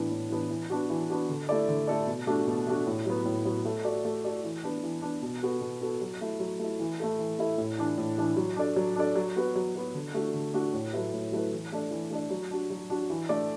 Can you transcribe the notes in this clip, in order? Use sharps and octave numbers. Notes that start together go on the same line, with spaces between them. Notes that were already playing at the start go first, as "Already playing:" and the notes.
Already playing: A2 E3 B3 D4
A2
E3 B3 D4
E3
B3 D4 F#4
E3
B3 D4 F#4
D3
A3 E4 A4 D5
D3
A3 E4 A4 D5
B2
A3 D4 F#4
B2
A3 D4 F#4
A2
F#3 B3
A2
F#3 B3
A3
F#4 A4 D5
A3
F#4 A4 D5
E3
B3 D4
E3
B3 D4
B2
B3 F#4 A4
B2
B3 F#4 A4
F#3
A3 E4
F#3
A3 E4
E3
A3 E4 A4
E3
A3 E4 A4
A2
E3 D4
A2
E3 D4
F#3
D4 A4 D5
F#3
D4 A4 D5
F#3
B3 F#4 B4
F#3
B3 F#4 B4
D3
A3 D4 F#4
D3
A3 D4 F#4
A2
F#3 A3 E4 B4
A2
F#3 A3 E4 B4
E3
A3 D4 A4 D5
E3
A3 D4 A4 D5
F#3
D4 F#4
F#3
D4 F#4
E3
A3 D4 A4 D5